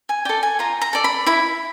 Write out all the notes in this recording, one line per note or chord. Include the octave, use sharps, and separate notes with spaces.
G#5
A4 D5 G5
G#5
F4 A#5
A#5
A4 D5
B5
E4 B5